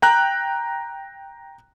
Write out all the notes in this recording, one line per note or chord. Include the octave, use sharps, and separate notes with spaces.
G5 A#5 F#6